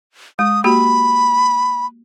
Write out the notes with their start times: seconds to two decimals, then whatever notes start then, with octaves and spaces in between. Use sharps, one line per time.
0.39 G#3 D#6
0.64 A#3 F#4 G4 B5